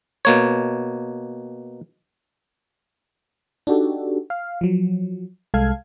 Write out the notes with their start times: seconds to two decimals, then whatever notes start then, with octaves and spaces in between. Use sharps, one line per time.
0.25 B2 A#3 C#5
3.67 D4 D#4 F#4 G4 A4
4.30 F5
4.61 F3 F#3
5.54 C2 G#3 A4 F5 G#6